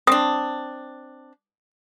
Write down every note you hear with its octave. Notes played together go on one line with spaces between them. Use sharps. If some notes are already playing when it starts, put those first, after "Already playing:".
C4 D4 D#6